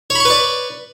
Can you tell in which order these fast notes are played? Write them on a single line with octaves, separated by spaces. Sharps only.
C#5 B5 C#6 B4 D5